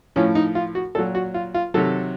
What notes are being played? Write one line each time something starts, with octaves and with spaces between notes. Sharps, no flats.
A2 F3 C#4
D#4
F4
F#4
A#2 F#3 A4
F#4
F4
F4
C3 D#3 F#3 A4